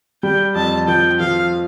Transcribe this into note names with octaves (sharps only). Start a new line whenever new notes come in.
G3 G5
F2 A5
F3 G5
F3 F5